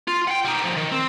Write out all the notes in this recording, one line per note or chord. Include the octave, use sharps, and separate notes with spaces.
F4
F#5 G5
G3 D#4
F3 D#4
D#3
C4